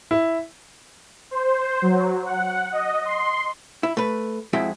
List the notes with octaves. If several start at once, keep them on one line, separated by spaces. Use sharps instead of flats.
E4
C5
F#3
F#5
D#5
C6
E4
A3 B4
F2 G#3 C4 E4 F#4 E5